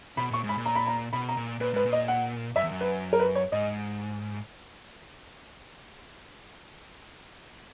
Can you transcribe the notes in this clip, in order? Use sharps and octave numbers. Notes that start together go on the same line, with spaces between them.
B2 B5
A#2 C#6
G#2
B5
A#2
A#5
B5
A#5
B2 B5
A#5
A#2
A#2 B4
G#2 B4
A#2
D#5
F#5
F#2 E5
E2
F#2
B4
A#4
B4
C#5
G#2 D#5